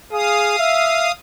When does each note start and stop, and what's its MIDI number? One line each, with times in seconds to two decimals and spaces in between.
0.12 0.56 68
0.12 1.12 77
0.12 1.12 87
0.59 1.08 76